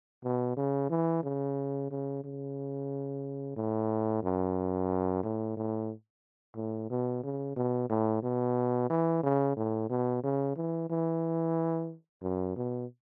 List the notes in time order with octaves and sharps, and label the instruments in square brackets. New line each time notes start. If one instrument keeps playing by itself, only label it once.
[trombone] B2
C#3
E3
C#3
C#3
C#3
A2
F#2
A2
A2
A2
B2
C#3
B2
A2
B2
E3
C#3
A2
B2
C#3
E3
E3
F#2
B2